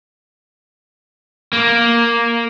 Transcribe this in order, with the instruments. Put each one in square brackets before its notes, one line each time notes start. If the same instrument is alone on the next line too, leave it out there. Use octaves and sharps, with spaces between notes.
[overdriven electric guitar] A#3